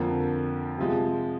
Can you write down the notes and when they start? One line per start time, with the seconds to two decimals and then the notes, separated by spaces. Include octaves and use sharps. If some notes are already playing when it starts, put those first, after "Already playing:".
Already playing: F2 D3 F3 A#3
0.78 C3 F3 G#3